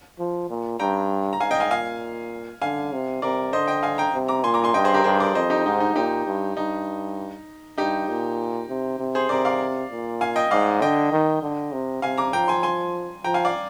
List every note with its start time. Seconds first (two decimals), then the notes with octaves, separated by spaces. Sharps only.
0.19 F3
0.50 A#2
0.79 G2 G5 A#5
1.33 A#5
1.40 G#2 F5 G#5
1.51 D#5 G5
1.60 F5 G#5
1.71 A#2 F5 G#5
2.62 D3 F5 G#5
2.93 C3
3.22 C3 A#4 D5
3.52 D3 C5 D#5
3.68 D#5 G5
3.83 F5 G#5
3.98 G5 A#5
4.14 C3
4.28 A#5 D6
4.44 A#2 G#5 C6
4.54 A#5 D6
4.64 G#5 C6
4.74 G2 D#5 G5
4.84 G#4 C5
4.94 G4 A#4
5.04 G2 G#4 C5
5.20 A#4 D5
5.35 F2 C5 D#5
5.50 D#4 G4
5.66 G#2 D#4
5.80 D#4
5.95 A#2 D#4 G4
6.26 G2
6.56 G2 D#4
7.78 G2 D#4 G4
8.09 A#2
8.69 C3
8.99 C3
9.15 G#4 C5
9.29 C3 A#4 D5
9.45 D5 F5
9.91 A#2
10.21 F5 G#5
10.36 D#5 G5
10.51 G#2 D5 F5
10.82 D3 D#5 G5
11.12 D#3
11.42 D3
11.72 C3
12.02 C3 F5 G#5
12.18 A#5 D6
12.33 F3 G5 A#5
12.48 G#5 C6
12.63 G#5 C6
13.24 F3 G5 A#5
13.34 F5 G#5
13.45 D5 F5